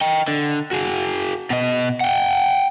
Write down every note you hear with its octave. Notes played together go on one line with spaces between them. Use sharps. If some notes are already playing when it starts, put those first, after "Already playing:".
D#5 G5
D3
F#4 G#4
B2 D#5
F#5 G5